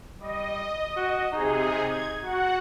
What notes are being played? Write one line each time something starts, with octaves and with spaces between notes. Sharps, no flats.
G3 D#5
F#4
C3 D#4 G#4
G#6
F#4 F#5